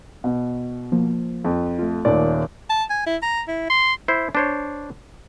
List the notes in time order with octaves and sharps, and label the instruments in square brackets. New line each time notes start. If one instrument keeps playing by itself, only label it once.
[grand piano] B2
[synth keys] F3 A#3
[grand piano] F2
[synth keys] A3 F4
[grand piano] D#1 D#2 D5
[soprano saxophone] A5
G#5
E4
A#5
E4
C6
[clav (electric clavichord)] E4 C5
D4 C5 C#5